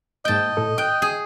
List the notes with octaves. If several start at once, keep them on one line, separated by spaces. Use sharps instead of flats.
G#2 A#3 D#5 G5 A5 G6
A2 A4
G5 D#6 F#6 G6
G#4